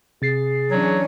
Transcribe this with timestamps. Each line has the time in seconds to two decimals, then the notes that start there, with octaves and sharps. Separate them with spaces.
0.22 C3 G#4 A6 C7
0.71 E3 F#3 C#4 D4